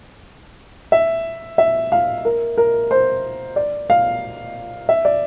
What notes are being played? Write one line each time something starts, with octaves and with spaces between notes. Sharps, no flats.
E5
E5
F5
A#4
A#4
C5
D5
F5
E5
D5